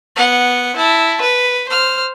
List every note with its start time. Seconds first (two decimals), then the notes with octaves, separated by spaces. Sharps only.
0.16 B3 F#5
0.75 E4 A5
1.20 B4
1.68 C5 F6